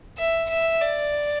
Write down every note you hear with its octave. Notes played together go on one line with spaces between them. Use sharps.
E5
E5
D5